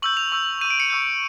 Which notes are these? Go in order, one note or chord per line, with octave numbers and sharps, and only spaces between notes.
C#6 E6 G6 F#7
F7
C#6 E6 G6
C#6 E6 G6 D#7
D7
C#7
C#6 E6 G6